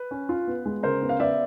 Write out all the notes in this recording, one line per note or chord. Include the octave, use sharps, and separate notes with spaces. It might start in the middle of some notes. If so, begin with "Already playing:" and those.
Already playing: B4
C#4
F4
B3
G#3
C#3 A#4 C5
B3
F5
B3 D5 E5